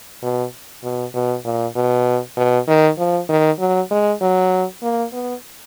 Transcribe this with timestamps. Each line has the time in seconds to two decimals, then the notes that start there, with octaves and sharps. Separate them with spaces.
0.22 B2
0.84 B2
1.14 B2
1.45 A#2
1.76 B2
2.37 B2
2.68 D#3
2.99 F3
3.29 D#3
3.59 F#3
3.91 G#3
4.21 F#3
4.82 A#3
5.13 B3